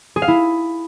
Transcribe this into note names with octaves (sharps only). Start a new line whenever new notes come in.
G#4
F5
E4